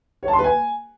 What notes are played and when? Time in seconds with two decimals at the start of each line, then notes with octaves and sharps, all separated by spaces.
0.23 C#5
0.28 A5
0.33 C6
0.39 B4
0.44 G#5